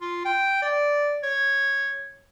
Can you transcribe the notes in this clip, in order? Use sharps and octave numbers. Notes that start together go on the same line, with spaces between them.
F4
G5
D5
C#5